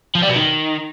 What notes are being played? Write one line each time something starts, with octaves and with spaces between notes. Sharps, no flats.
F3
G3
B2
D#3